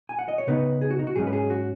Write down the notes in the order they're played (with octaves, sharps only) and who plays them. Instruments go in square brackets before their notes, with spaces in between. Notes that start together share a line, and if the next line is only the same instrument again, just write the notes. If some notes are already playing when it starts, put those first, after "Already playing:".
[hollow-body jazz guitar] G#5
F#5
D#5
C#5
C#3 B3 D#4 B4
G#4
F#4
D#4
F#4
G#2 F#3 C#4 G#4
B4
G#4
F#4